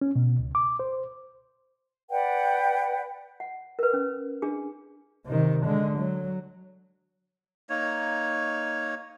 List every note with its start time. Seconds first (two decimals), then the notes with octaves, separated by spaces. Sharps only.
0.01 C#4
0.16 B2
0.39 C#2
0.55 D6
0.80 C5
2.10 B4 D5 F#5 G5
3.40 F#5
3.79 A#4 B4
3.93 C#4
4.42 D4 G#4
5.26 C3 D#3
5.66 D3 G#3
5.98 F#3
7.70 A#3 D#4 C#5